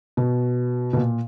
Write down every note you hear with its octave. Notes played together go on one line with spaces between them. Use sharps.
B2
B2
A#2